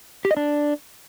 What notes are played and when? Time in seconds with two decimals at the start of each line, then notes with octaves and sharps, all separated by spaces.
0.25 G4
0.31 D#5
0.37 D4